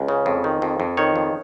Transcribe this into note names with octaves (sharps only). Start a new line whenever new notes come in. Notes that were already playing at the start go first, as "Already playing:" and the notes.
Already playing: C#2
C#3
F2
D#3
F2
F2
D#3 C#5
F2